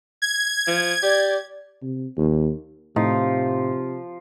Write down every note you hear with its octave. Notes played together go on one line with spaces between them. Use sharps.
G#6
F3
G4 D5
C3
D#2
A2 C3 F3 D#4